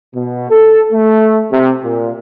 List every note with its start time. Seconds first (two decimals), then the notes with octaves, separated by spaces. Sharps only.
0.15 B2
0.50 A4
0.92 A3
1.51 C3
1.83 A#2